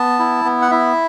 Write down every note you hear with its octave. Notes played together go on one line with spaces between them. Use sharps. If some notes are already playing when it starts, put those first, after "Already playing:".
Already playing: B3 A5
E4
B3
F#5
E4 E5